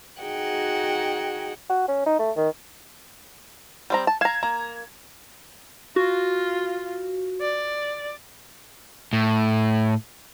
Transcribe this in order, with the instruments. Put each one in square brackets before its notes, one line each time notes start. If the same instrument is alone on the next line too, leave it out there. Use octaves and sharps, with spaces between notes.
[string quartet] D#4 F#4 G#4 F#5 G5
[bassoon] F#4
C#4
D#4
A3
D#3
[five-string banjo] G3 C4 A#5
A5
[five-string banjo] F5 A#5 [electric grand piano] G#6 E7
[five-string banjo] A#3 [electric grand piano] A#5
[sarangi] F4 [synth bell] F#4
[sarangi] D5
[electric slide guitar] A2